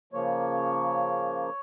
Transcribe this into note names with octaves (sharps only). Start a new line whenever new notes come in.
C#3 F3 A#3 C#5